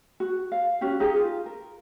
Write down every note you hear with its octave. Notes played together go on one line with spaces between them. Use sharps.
F#4
F5
C#4 F#4 G4
D#4 G4 G#4
F4
A#4